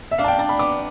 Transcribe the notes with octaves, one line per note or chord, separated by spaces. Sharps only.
E5
D4 F5
A5
G5
D4 A5
B5
B3 D6